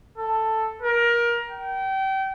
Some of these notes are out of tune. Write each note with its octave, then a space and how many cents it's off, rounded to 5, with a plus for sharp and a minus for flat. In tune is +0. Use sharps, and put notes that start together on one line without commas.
A4 +5
A#4 +20
G5 -30